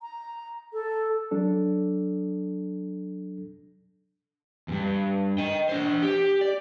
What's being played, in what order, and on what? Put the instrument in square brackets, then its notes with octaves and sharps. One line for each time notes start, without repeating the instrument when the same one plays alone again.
[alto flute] A#5
A4
[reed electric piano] F#3 D4 A4
[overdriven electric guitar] E2 G2
D#5 G5
D4 C5
G4
D5